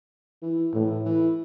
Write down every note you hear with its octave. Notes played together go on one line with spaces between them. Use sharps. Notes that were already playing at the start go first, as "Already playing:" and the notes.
E3
A2 E3
E3